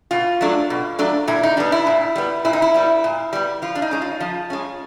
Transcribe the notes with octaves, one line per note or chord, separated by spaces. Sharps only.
B2 F4
F#3 A3 D4
B2
F#3 A3 D4
A#2 E4
D#4
G3 B3 D4
E4
A#2
G3 B3
A#2 E4
D#4
E4
G3 B3
A#2
G3 B3
F3 F4
D4
D#4
G#3 C#4
F4
F3
G#3 C#4